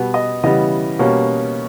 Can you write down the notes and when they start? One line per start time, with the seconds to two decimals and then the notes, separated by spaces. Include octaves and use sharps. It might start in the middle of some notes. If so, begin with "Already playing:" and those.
Already playing: B2 G3 B3
0.14 D#5
0.44 C#3 E3 G3 B3 D#5
0.99 B2 G3 A#3 C#4